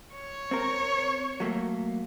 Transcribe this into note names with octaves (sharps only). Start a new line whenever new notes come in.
C#5
C4 A#4
F#3 A3 A#3